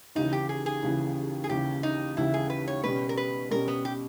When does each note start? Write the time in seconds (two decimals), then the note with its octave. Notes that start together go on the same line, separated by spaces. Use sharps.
0.15 D#2 C#3 E3 D#4
0.33 G4
0.49 G#4
0.66 G#4
0.82 D#2 C#3 E3
1.44 G#4
1.49 D#2 C#3 E3 G4
1.83 D#4
2.17 D#2 C#3 E3 E4
2.34 G#4
2.50 B4
2.68 C#5
2.84 B2 G3 C#4 B4
3.09 A#4
3.17 B4
3.51 B2 G3 C#4 A#4
3.68 B3
3.85 G4